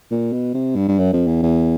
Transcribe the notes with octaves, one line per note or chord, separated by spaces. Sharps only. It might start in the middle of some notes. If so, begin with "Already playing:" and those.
A#2
B2
C3
G2
G2
F#2
F2
E2
E2